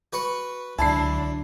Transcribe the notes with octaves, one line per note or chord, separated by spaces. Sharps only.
F#4 B4 C#6
C#2 D3 F#3 D4 E4 A5 C7